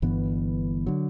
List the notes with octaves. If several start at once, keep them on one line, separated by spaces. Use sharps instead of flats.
G1 G2 E3 B3
D3 F#3